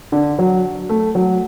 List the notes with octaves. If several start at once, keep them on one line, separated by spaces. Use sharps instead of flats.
D3
F#3
A3
F#3